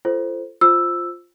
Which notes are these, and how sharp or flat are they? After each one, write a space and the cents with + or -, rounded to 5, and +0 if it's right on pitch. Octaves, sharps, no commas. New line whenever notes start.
F4 -30 A4 +0 C5 +0
F4 +0 C5 +0 E6 +0